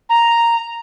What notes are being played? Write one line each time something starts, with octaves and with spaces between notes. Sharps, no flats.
A#5